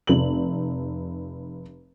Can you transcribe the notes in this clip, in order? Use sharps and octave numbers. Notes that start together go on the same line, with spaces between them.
F1 F#7